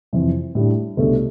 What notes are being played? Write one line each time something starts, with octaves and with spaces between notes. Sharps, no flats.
F2 C3 E3
A2 G3 D4
C2 B2 A3 D4 A4